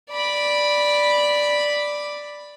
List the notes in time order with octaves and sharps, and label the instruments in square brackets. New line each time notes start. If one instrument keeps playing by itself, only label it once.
[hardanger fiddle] D5 B5